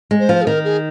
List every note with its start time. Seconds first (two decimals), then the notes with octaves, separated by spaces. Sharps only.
0.11 G#3
0.19 C5
0.29 F3
0.42 G#4
0.47 D#3 A#4
0.65 G#4